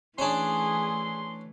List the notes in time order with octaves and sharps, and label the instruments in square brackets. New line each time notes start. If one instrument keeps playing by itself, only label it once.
[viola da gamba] E3 A3 [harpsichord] C#4 D4 [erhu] G#4 [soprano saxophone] C6